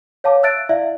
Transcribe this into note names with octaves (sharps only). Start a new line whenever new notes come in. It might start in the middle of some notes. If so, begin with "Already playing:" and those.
C#5 F5 A5 D6
E5 E6 F#6 A6 D7
E4 D5 E5 F5